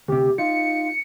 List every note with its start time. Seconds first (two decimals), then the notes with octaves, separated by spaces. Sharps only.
0.08 D2 C3 G4
0.38 D#4 F4 C#7